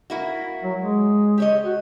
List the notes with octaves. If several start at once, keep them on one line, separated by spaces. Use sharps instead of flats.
A#3 E4 F#4
F#3
G#3
G4 C#5 D#5
F#4